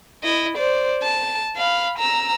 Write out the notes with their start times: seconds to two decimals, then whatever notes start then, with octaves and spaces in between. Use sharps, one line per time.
0.23 E4 D#5
0.57 C5 D5
1.02 A5
1.56 F5 B5
1.98 A#5 E6